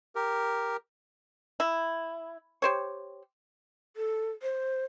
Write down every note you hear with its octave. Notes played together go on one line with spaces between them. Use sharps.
G4 A#4
E4
G4 C5 C#5
A4
C5